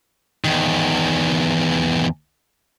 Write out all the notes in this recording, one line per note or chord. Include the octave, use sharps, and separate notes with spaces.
E2 D#3